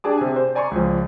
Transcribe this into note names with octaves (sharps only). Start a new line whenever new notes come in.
D4 G4 G#4 A5 D6
C3 G#5
C5
D5 G#5 A#5 C6 C#6
C#2 F3